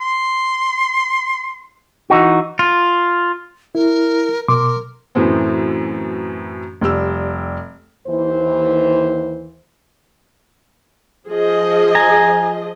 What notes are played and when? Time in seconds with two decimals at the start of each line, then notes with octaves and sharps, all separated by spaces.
0.01 C6
2.10 E3 D#4 F#4
2.59 F4
3.75 E4 A#4
4.48 B2 A#4 C6 D6
5.15 F#2 A2 E3 C4
6.81 F1 G3 G4 E6
8.07 D#2 E3 C5
11.28 F3 G#4 D#5
11.95 G#5 A#5